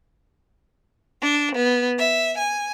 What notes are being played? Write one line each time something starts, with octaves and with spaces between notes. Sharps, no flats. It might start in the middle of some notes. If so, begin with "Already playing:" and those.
D4
B3
E5
G#5